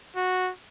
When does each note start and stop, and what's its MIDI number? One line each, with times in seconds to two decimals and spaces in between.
0.16 0.51 66